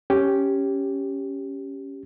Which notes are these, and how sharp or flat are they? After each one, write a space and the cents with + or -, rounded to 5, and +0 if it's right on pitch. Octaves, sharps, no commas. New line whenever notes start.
C#4 +0 G4 -5